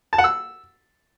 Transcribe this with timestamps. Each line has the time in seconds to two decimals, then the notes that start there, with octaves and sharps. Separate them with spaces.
0.13 A5
0.18 F#5
0.24 E6